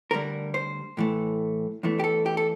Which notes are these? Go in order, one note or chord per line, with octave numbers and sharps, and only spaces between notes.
D2 D3 G3 A#4
C5
A2 E3 A3
E2 E3 A3
G4
A4
G4
A4